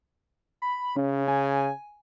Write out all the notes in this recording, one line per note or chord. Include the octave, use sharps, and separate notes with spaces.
B5
C#3 C#4
G#5